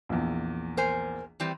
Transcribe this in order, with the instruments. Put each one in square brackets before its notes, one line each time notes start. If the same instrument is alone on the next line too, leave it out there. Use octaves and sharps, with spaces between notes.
[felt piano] A#1 E2
[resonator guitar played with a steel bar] A#4 C5 G#5
E3 G3 C4